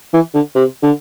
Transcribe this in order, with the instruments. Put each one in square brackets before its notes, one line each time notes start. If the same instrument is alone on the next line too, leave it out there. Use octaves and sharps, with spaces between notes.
[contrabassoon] E3
D3
C3
D3